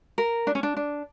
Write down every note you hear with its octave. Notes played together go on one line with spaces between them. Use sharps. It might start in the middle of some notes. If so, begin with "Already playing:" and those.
A#4
D4
C#4
D4
D4